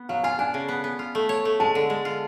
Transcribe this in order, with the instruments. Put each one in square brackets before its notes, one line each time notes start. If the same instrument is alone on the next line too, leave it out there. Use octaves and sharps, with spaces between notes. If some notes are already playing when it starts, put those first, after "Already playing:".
Already playing: [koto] B3
[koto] F#3 [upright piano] F5
[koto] F4 [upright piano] G#5
[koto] D4 [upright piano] G#5
[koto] C#3
B3
B3
F4
A3
C#5
A3
[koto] G#3 [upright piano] A5
[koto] D3
G#3
F4